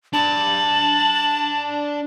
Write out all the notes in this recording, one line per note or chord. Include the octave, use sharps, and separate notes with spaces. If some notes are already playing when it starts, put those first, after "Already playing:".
D4 A5 B5 F#7